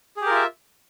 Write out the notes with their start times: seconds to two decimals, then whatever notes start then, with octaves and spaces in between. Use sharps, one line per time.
0.17 G#4
0.21 G4
0.26 A#4
0.31 F4
0.35 E5